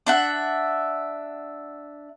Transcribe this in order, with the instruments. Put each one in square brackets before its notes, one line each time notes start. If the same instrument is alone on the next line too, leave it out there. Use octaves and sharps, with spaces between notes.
[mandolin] D4 E5 F#5